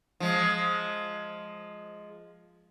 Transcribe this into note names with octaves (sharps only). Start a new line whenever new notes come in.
F3 G#3